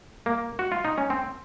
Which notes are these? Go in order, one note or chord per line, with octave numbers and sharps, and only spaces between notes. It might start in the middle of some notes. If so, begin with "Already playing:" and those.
A#3
F#4
F4
D#4
C#4
C4